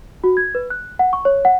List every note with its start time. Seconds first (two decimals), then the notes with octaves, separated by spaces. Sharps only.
0.24 F#4
0.37 G#6
0.55 B4
0.70 F#6
0.99 F#5
1.13 C#6
1.25 C#5
1.45 F#5